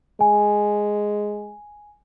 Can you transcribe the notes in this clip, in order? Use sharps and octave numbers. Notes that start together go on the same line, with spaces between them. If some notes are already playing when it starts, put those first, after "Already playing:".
G#3 G#5